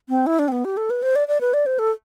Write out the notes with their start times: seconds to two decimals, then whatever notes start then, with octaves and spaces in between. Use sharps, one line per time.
0.09 C4
0.26 E4
0.39 D4
0.48 C4
0.52 B3
0.65 G4
0.77 A4
0.90 B4
1.03 C5
1.16 D5
1.28 D5
1.41 B4
1.54 D5
1.66 C5
1.79 A4